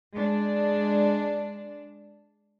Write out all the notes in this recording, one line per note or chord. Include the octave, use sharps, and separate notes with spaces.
G#3 D4